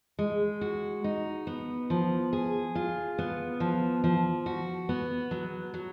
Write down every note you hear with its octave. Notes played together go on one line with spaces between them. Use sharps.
G#3
F#4
D#4
B3
F3
G#4
F4
B3
F3
F3
F#4
B3
F#3
F#3